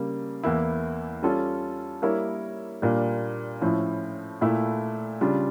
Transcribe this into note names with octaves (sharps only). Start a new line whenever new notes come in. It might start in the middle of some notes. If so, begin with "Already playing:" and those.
Already playing: C#3 G3 A#3
E2 E3 A#3 E4
G3 C#4 F4 A4
G3 A#3 E4 A#4 C#5
A#2 G3 A#3 D4
A2 F3 C#4 E4
A#2 A3 E4 A4
C#3 G3 D4 F4